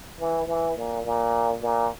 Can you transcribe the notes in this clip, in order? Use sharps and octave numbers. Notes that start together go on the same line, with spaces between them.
E3
E3
A#2
A#2
A#2